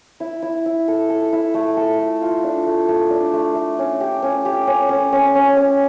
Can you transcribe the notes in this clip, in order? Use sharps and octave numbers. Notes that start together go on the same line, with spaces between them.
E4
E4
E4
A4
A4
E4
A3
A4
A3
F4
D4
A3
A3
D4
A3
A3
C#4
G4
C#4
G4
C#4
C#4
C#4
C#4
C#4